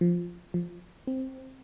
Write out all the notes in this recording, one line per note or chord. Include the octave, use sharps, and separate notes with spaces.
F3
F3
C4